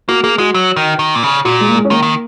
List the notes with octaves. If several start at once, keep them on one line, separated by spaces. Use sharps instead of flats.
A#3 F#4
A#3 G#4
G#3 F#4
F#3
D#3
D#3
A#2
C#3
A#2 F#4
G#3
A#3
G#3
C#4
D#3 A#3
D#3